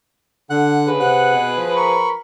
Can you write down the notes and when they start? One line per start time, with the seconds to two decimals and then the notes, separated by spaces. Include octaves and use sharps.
0.50 D3 F#5 F#6
0.87 C#3 G#4 B4
1.00 C3 F#5 F#6
1.33 B2
1.58 F3
1.76 A#4 B5 C#6